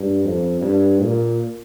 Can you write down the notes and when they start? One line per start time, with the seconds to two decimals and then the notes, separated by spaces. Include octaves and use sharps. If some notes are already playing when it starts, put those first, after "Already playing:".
Already playing: G2
0.24 F2
0.61 G2
0.99 A#2